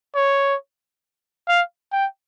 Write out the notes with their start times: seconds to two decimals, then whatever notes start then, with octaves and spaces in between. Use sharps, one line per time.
0.15 C#5
1.48 F5
1.92 G5